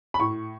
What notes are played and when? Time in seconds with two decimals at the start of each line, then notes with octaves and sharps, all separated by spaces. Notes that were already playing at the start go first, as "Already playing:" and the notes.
0.14 B5
0.20 A2 C#6